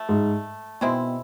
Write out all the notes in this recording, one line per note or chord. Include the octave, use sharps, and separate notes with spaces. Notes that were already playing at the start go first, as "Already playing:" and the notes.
Already playing: F3 A3
G#2
B2 D#3 G#3 C4 E4